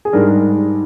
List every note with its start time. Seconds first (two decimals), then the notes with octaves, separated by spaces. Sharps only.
0.05 G#4
0.13 G#2 G3 D4 A#4